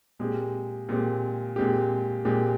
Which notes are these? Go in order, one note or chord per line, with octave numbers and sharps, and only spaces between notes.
A#2 G#3 C4 G4
A#2 G#3 C4 G4
A#2 G#3 C4 G4
A#2 G#3 C4 G4